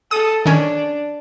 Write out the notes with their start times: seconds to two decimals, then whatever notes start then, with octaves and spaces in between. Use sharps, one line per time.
0.11 A4 D#6
0.46 D#3 C#4 D4